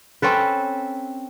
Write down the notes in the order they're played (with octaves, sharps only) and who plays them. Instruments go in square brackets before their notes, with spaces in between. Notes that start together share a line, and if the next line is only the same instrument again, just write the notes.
[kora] C4 C#4 A4 B4